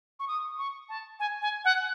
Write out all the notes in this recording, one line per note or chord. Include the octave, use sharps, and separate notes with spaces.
C#6
D#6
C#6
A5
G#5
G#5
F#5